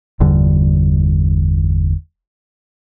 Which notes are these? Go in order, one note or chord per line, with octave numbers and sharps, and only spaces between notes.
G1 E2 D3 G3